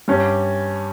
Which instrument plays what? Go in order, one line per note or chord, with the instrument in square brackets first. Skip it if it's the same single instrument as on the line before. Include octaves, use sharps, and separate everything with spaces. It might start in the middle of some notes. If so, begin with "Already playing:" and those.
[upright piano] G2 G3 C#4 G4